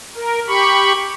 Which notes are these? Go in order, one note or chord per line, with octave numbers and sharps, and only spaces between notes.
A#4
G4 B5 C#6